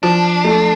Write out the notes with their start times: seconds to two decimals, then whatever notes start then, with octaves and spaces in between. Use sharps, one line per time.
0.03 F3 D4
0.44 A3